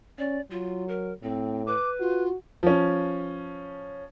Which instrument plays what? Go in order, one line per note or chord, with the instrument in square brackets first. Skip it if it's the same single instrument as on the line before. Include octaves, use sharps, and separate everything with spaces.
[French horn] C#4 [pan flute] D5
[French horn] F#3 [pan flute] F4
[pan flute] A#4
[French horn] A2 [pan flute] C4
[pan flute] B4 [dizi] D6
[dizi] F4 [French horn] F#4
[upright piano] F3 C#4